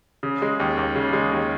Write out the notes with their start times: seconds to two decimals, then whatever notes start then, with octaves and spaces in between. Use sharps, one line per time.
0.23 C#3
0.42 G#3
0.60 D#2
0.77 D#2
0.95 C#3
1.13 G#3
1.32 D#2